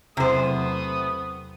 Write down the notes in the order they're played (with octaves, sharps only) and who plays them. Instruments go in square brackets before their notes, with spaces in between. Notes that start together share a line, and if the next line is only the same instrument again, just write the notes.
[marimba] E2 F#3 [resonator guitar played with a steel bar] C3 C5 [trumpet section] A3 B3 D#6